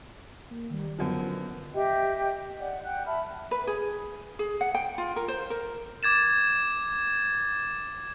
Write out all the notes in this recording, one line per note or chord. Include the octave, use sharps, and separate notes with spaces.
A#3
D#3 G3
F#2 D3 F3 B3
G4 D#5 E5 G5
D5 F#5
F#5 G5 F#6
E5 A5 B5 F6
B4
G#4
G#4
F#5
G5
F4
A#4
C5
A#4
D6 G#6 A6 E7